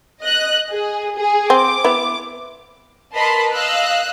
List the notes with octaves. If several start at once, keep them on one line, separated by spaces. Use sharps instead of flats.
D#5 F#6
G#4
G#4
C4 D6
B3 E4
A#4 B4 D#5 A5 B5 C6
D#5 F5 E6 F#6